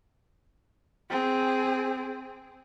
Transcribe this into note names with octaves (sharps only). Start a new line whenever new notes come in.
C4 G#4